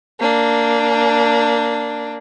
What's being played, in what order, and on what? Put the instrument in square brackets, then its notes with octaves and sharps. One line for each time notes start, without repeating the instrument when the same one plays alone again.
[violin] A#3 D4